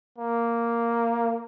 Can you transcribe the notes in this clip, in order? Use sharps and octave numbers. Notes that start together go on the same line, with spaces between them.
A#3